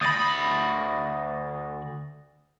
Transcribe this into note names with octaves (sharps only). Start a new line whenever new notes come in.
D2 B5 D#6 A6 A#6